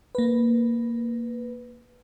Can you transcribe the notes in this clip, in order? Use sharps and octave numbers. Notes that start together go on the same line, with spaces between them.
A#3 B4